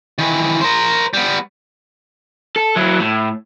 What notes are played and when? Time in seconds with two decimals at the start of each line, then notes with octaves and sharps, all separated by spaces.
0.18 D#3 E3
0.61 A#4 C5
1.13 G3 B3
2.56 A4
2.76 F#3 E4
3.00 A2